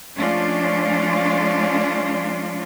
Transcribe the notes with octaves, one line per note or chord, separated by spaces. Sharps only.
F3 G#3 A3 C#4 D4 F4